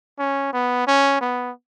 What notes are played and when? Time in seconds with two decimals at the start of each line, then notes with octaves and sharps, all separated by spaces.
0.19 C#4
0.53 B3
0.87 C#4
1.21 B3